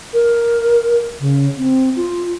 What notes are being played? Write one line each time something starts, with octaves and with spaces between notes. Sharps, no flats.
A#4
C#3
C4
F4